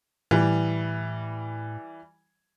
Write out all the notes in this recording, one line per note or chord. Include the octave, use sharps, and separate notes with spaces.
A2 E3 G3